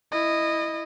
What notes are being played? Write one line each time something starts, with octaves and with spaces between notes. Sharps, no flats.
E4 D#5